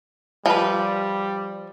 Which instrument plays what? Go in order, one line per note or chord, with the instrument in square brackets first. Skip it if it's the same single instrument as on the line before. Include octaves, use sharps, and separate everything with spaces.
[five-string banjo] F3 B4 [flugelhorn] G3